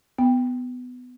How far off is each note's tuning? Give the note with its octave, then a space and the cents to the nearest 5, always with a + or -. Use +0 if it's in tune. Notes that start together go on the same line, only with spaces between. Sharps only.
B3 +15 G5 +10